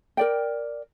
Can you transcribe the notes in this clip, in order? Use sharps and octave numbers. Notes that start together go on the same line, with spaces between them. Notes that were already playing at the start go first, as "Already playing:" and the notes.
A#4 D5 G5